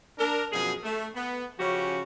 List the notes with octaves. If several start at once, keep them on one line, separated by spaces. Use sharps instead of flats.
D4 A#4
F#2 B2 F3 G#4
A3
B3
C#3 F3 C#4 F#4 G4